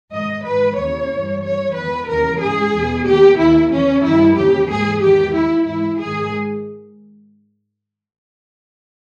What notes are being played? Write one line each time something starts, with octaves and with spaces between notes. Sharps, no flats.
G#2 D#3 D#5
G#2 D#3 B4
D#2 C#3 E3 C#5
G2 E3
G2 E3 C#5
E2 D#3 B4
D#2 C#3 E3 A#4
G#2 E3 G#4
E2 B2
D#2 D#3 G4
D#2 D#3 E4
E2 C#3 E3 C#4
G2 D#3 E4
D#2 C#3 E3 G4
G#2 E3 G#4
E2 D#3 G4
D#2 D#3 E4
G#2 E3 E4
G#2 D#3 G#4